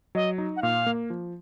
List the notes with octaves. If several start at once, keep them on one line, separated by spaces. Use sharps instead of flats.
F#3 D#5
D#4
F#5
A#2 F5
A#3
F3